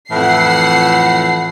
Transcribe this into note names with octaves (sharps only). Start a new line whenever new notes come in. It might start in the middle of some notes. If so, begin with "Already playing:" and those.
F2 A2 E3 F#5 C7